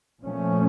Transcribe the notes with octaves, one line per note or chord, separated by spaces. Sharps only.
A#2 F3 A3 C#4